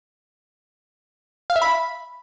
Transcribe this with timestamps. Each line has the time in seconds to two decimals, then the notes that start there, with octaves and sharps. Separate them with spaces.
1.50 F5
1.56 E5
1.62 B5